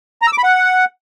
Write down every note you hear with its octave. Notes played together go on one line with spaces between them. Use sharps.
A#5
E6
D6
B5
F#5